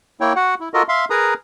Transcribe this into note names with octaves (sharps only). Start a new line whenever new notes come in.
A#3 E4 C#5 G5
F#4 F#5
E4
F4 F#4 A4 A#4 D#5
E5 F5 C6
G#4 A#4 B4 A#5 D#6